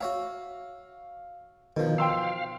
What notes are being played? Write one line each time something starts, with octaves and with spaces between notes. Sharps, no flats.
F#4 C#5 E5 F5
B2 D#3 F3
F5 G5 C6 E6